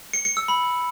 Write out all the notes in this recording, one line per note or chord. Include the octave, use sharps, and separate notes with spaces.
C#7
C#7
E6
B5